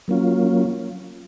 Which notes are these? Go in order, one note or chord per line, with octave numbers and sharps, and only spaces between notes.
F#3 A#3 C#4 F4